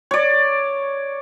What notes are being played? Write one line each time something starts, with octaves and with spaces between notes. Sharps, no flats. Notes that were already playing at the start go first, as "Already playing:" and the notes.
C#5 D5